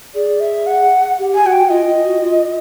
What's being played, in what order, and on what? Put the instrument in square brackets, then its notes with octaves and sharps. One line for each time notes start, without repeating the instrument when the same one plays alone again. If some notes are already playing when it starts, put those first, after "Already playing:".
[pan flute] G#4 [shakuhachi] D5
[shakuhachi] E5
F#5
[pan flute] G4
[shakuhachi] G#5
[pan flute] F#4 [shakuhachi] F#5
[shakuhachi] G5
[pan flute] F4 [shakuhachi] D#5
[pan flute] F4
F#4
F4